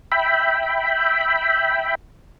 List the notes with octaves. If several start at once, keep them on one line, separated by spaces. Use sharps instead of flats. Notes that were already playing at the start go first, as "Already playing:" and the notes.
E5 G5 B5